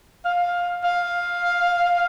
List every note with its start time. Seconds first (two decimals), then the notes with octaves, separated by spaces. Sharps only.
0.25 F5
0.84 F5